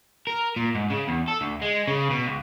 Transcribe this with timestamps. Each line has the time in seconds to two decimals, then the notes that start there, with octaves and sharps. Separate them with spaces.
0.27 A#4
0.56 A#2
0.75 G#2
0.90 C#3
1.08 E2
1.28 A4
1.41 D2
1.62 G#3
1.88 C#3
2.10 B2
2.26 C#2